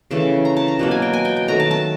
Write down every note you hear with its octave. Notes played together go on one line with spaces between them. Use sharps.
C#3 E3 A3 A5
A#5
A5
A#5
B2 F#3 A#3 A5
G#5
G5
G#5
G5
G5
D#3 F#3 A3 A#5
A5
A5